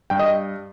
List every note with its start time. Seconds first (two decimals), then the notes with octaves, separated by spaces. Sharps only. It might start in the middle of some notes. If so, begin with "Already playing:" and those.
0.10 G2 G5
0.19 D#5